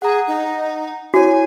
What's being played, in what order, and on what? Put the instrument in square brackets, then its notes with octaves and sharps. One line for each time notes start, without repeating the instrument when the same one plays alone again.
[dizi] G#4 [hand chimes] F#5 A#5
[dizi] D#4
[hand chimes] E4 C#5 [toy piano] F#4 [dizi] G#5